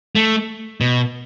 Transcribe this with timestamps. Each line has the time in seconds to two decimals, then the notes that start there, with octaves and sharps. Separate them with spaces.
0.15 A3
0.81 B2